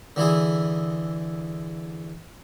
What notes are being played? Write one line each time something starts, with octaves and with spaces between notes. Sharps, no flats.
D3 E3 E4 G#4